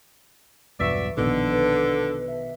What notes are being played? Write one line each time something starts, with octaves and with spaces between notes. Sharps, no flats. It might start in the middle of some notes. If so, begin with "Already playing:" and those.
B1 E2 G2 F#4 B4 D5 E5
A#1 B2 D3 D#3 B3 A4
B4
E5